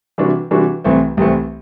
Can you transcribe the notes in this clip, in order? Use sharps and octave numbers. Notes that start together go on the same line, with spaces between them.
C3 E3 G3 D4 F#4
C3 E3 G3 D4 F#4
C2 C3 E3 A3 C4
C2 C3 E3 A3 C4